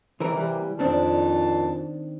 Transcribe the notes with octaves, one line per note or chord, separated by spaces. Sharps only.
C3 E3 A#3 A#4
E3 G3
F2 A#2 D#3 C4 D4 A5